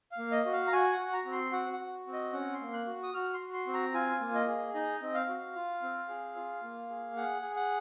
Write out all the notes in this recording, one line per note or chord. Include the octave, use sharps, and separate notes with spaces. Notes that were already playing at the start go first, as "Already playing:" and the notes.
F5
A#3
D#5
F#4
F5
A#5
F#4 G#5
F#5
F#4
A#5
C4
C6
F#4 F#5
F#5
F#4
C4
D#5
C#4 F#5
C6
A#3
F#6
F#4
D#6
F#4 F6
C6
F#4
C6
C4
A#5
F4 G#5
A#3
D#5
G#4
D#4 D#5
C4
F5
F#4
F4
C4
G#4
F4
A#3
G#4
G#4 F#5
G#4
F#5